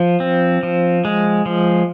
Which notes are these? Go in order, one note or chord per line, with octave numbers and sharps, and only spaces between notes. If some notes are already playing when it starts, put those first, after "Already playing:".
Already playing: F3
C4
F3
G#3
F3